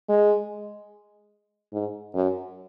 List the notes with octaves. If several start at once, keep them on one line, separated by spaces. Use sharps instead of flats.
G#3
G#2
F#2